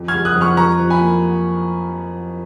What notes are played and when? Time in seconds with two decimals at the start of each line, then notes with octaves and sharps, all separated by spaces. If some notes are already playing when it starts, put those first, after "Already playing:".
Already playing: F2
0.08 F6 G#6
0.14 G#3
0.25 D#6 F#6
0.36 F2
0.41 C#6 F6
0.57 F3 A#5 C#6
0.79 F3
0.90 G#5 B5
1.01 A#3